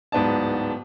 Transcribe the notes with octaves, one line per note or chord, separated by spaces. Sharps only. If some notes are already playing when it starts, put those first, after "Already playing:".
D1 G#2 B3 D5 A5